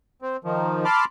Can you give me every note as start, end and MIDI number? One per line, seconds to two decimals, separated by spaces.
0.22 0.37 60
0.44 0.85 51
0.44 0.85 53
0.85 1.05 81
0.85 1.05 83
0.85 1.05 84
0.85 1.05 86
0.85 1.05 89